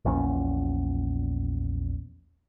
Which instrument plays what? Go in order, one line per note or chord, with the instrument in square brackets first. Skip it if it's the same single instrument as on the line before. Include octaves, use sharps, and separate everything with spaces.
[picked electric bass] A#1 E2 A#2 C#4